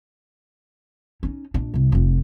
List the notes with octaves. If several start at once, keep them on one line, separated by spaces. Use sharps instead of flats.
C#4 D#4
A#1 D4
C2 C3
F1 F2